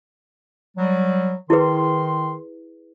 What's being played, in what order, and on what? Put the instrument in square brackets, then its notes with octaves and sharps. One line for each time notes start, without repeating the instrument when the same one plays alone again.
[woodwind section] F#3 G3
[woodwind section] D#3 C6 [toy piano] E4 G#4 B4